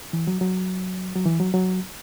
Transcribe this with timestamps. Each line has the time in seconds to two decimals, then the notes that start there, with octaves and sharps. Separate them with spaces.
0.13 E3
0.27 F#3
0.41 F#3
1.16 F#3
1.25 E3
1.40 F#3
1.54 F#3